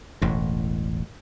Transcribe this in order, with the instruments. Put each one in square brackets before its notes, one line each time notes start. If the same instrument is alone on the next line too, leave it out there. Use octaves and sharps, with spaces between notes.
[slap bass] E1 A1 A2